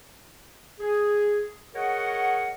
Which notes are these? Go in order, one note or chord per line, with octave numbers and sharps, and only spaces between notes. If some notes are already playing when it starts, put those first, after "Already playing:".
G#4
F#4 G#4 A#4 C#5 D#5 F#5